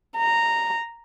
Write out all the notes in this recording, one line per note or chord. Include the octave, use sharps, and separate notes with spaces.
A#5